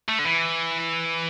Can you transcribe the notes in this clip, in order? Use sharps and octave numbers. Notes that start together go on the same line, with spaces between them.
A3
D3
E3